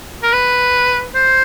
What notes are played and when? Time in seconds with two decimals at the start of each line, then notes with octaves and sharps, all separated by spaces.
0.23 A#4
0.33 B4
1.15 C5